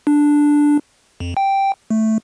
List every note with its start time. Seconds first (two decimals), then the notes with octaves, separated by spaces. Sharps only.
0.07 D4
1.20 F2
1.37 G5
1.90 A3